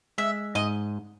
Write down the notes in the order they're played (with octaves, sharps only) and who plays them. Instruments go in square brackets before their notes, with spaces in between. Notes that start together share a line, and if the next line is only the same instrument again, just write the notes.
[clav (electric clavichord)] G#3 [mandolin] E5
[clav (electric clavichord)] G#2 [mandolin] D#5